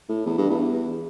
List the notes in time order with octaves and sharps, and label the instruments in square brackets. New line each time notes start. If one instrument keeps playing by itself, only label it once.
[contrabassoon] A2
E2
G2
E2